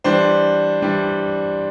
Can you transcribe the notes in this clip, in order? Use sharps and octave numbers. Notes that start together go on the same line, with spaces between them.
E3 G3 D4 C5
E3 G3 D4